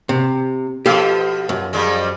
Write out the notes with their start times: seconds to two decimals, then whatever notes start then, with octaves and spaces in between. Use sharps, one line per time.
0.09 C3
0.86 B2 F3 G4 A4 F5
1.49 F#2
1.73 F2 G3 G#3